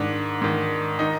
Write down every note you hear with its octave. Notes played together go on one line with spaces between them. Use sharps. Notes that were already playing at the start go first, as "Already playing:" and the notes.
Already playing: G#2 D#3 D4
G#2 D#3
D#3 D#4